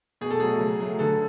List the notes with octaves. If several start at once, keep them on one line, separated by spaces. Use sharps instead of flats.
B2 G#4
A4
F#3 A3 G#4
C#3
F#3 A3
D3 A4